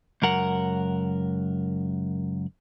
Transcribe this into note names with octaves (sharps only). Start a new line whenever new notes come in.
C#2 F#2 A#4 F#5